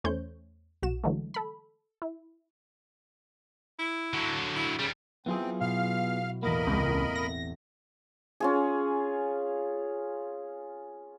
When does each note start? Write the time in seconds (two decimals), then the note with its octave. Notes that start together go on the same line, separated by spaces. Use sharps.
0.04 E2 A3 C#4 C5 C#5 G6
0.82 B1 F#4 E7
1.04 D3 E3 F#3 G#3 A3
1.34 A4 B5
2.02 E4
3.79 E4
4.13 D3 F#3
4.56 E4
4.79 D#2 C#3 G3
5.26 F#3 B3 C4 E4 F4 G#4 C5
5.61 B2 F5 F6
6.43 A1 E2 A#3 A#4 D#5 F#5 B5
6.67 C#2 C4
7.15 A#6
8.40 C#4 F4 G#4